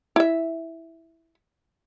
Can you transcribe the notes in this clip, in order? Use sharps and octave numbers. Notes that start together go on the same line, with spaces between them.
E4 E5